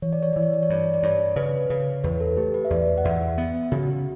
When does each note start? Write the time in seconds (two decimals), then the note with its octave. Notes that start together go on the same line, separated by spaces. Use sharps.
0.02 E3 C#5
0.13 D5
0.23 C#5
0.33 E3 D5
0.43 C#5
0.53 D5
0.63 C#5
0.70 G2 D5
0.84 C#5
0.94 D5
1.03 G2 C#5
1.36 C#3 B4
1.70 C#3 C#5
2.04 E2 B4
2.20 A4
2.37 A3 G4
2.54 B4
2.65 E5
2.70 E2 D5
2.98 F#5
3.04 E2 E5
3.38 B3 E5
3.72 C#3 F#4